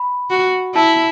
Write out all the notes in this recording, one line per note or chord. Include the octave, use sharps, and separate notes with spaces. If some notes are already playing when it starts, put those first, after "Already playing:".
Already playing: B5
F#4
E4 A5